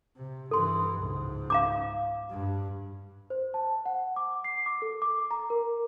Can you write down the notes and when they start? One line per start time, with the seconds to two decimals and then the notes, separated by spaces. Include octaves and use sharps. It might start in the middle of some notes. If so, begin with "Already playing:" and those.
0.17 C3
0.51 G2 E3 A4 C6
1.00 C#2 G#2
1.50 F5 A#5 D6
2.30 G2
3.30 C5
3.54 A5
3.86 F#5
4.16 D6
4.44 C7
4.66 D6
4.82 A4
5.02 D6
5.31 A#5
5.50 A#4